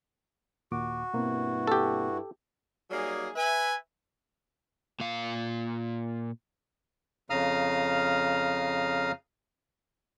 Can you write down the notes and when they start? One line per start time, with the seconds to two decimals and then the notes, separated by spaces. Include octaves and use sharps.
0.72 D#2 A#2 F#4 D6
1.14 G2 B2 A#3 C4 E4
1.67 G4 A4
2.91 F#3 G3 A#3 D#4 G#4
3.35 B4 E5 G#5
5.00 A#2 F5
7.30 F2 C#3 F5 A#5 D#6 F6